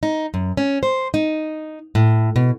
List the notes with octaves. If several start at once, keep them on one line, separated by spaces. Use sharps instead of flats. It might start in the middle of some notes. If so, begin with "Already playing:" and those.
D#4
F#2
C#4
C5
D#4
A2
B2